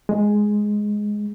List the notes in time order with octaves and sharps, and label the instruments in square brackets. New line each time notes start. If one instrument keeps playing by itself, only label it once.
[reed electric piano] G#3